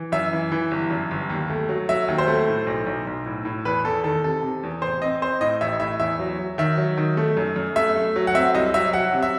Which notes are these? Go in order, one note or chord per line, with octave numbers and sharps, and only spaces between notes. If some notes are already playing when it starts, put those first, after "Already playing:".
Already playing: E3
F#2 E5
E3
E3
G1
F#2
G1
D#2
A3
F#3
F#3 E5
D#2
C5
A3
A2
B1
B1
B1
A2
A2
E2 B4
E2 A4
D#3 A4
C3 A4
C3
E2
A1 C5
C4 D#5
C4 C5
A2 D#5
A1 E5
A2 E5
E2 E5
F#3
F#3
D#3 E5
F#3
D#3
A3
F#2
F#2
A3 E5
A3
F#3
F#5
C4 E5
C2 D#5
F#3 E5
F#3 F#5
C3
E5